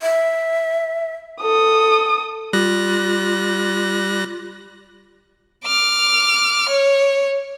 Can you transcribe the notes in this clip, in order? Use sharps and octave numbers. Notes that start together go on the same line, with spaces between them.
E5
A4 D#6
G3 F4 F#6 A#6
D6 F6
C#5